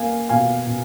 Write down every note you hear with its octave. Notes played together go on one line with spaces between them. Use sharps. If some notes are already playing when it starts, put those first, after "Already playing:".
Already playing: A#3 F5 G#5
B2 F5 G#5
B2